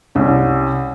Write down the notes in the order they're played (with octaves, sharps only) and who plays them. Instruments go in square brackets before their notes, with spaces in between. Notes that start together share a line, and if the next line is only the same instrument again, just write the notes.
[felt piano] C2 C#4